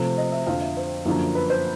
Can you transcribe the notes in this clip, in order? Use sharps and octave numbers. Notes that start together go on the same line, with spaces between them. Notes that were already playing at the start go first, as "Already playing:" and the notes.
Already playing: C3 F3 A3
D#5
E5
F2 D3 F3 F5
E5
C5
F#2 D3 F3 A#3
B4
C5